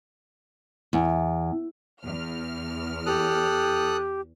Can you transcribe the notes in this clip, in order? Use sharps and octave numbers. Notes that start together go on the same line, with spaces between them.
E2
E2 F6
G4 A4 D#6 F#6